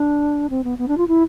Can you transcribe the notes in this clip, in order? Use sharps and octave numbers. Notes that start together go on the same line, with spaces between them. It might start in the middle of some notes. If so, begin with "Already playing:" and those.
Already playing: D4
C4
B3
B3
D4
F4
E4